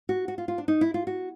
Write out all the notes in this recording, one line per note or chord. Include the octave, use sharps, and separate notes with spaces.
F#4
F#4
F4
F4
D4
D#4
E4
F4
F#4